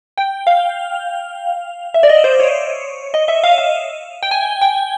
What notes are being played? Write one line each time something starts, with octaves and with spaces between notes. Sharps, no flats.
G5
F5
E5
D5
D#5
C5
C#5
D#5
E5
F5
F5
G5
G#5
G5